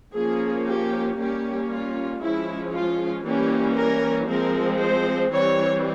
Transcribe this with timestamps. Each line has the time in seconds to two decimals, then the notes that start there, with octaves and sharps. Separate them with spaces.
0.15 F3 A#3 C#4 G#4
0.66 G4
1.18 G3 A#3 C#4 G4
1.70 F4
2.21 F3 G#3 C#4 E4
2.73 F4
3.25 E3 G3 A#3 C#4 G4
3.77 A#4
4.28 F3 G#3 C4 A#4
4.80 C5
5.32 E3 G3 C4 C#5